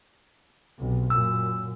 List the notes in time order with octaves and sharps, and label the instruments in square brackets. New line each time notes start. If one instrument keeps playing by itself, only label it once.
[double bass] B1 C3
[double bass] F#2 A#2 [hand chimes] E6